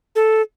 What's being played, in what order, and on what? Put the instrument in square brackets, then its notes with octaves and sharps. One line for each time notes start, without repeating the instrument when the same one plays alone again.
[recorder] A4